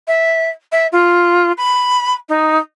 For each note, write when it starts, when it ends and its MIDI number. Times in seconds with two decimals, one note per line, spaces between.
0.08 0.50 76
0.72 0.87 76
0.92 1.52 65
1.58 2.13 83
2.29 2.58 63